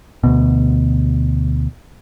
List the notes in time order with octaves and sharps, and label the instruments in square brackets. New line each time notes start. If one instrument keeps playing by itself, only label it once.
[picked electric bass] D2 B2